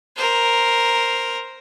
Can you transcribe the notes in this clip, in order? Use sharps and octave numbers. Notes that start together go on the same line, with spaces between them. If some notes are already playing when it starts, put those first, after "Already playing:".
A#4 C5